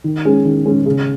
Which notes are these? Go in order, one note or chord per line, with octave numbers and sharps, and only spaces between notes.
D#3
G#3 C#4 G#4
D#3
G#3 C#4 G#4
C#3